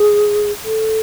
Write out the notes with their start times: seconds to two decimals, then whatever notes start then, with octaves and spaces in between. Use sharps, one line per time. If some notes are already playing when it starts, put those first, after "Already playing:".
Already playing: G#4
0.64 A4